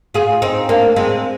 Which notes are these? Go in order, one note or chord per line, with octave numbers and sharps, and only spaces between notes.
F4 G#4
C4 D#4
A#3 D4
G#3 C4